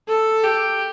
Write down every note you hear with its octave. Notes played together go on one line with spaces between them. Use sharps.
A4
G4